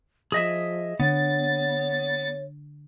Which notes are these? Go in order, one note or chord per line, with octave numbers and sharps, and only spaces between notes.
F3 G#4 D#5 E5
D3 B3 C#5 A6